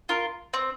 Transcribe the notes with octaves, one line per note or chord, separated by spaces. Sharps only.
F4 A#4
C4